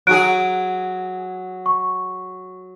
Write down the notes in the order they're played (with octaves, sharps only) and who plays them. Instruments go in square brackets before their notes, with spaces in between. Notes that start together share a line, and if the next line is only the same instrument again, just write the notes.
[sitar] F#3 F#4 G#4 [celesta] F#6 D7
[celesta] C#6